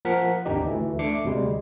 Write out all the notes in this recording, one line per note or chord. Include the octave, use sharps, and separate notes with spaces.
F3 A#3 A#4 F#5 B6
G#1 D#2 D4 D#4 G4 D#5
D2 E3 A3
A3 D4 D6 C7 C#7
D2 C3 G3 G#3